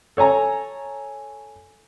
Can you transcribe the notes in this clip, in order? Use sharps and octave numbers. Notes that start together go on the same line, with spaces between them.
A4 C#5 G#5 A#5